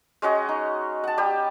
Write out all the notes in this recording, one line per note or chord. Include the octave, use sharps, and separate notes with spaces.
G#3 C#4 F#4 D#5
D#4
F#5 A5
G3 G4 G5 D#6